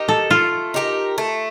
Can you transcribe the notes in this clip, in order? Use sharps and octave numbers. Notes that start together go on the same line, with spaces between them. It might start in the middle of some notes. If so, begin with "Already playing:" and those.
Already playing: D#4 G4 A#4
A4
A3 F4
D#4 G4 A#4
A3